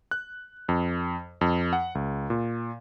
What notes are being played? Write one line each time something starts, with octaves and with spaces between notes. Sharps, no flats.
F#6
F2
F2
F#5
C#2
A#2